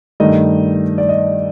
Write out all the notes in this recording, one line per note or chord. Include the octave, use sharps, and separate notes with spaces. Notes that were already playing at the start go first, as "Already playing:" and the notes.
G2 D#3 A3 D#5
D5
D#5